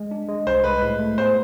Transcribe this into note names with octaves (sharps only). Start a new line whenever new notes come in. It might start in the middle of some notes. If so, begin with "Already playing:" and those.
Already playing: G#3
D4
G#3
C2 C5
G#3 B4
A2
A3
B3 C5